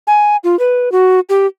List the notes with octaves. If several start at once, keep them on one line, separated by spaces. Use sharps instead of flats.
G#5
F4
B4
F#4
G4